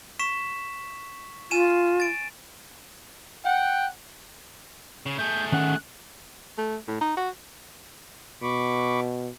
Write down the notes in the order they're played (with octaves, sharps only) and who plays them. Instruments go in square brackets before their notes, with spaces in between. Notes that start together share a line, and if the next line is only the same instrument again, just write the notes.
[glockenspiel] C#6 B6 E7
[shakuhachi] F4 [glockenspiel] G#5 D#7 E7
[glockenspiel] A6 D7
[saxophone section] F#5 [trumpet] G5
[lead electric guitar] C#3
[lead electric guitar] A3 G#4 [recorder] G6
[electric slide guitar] D#3 C#4 F#5 [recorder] F#6
[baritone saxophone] A3
A2
D#4
F#4
[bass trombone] B2 [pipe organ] B5 C#6 D6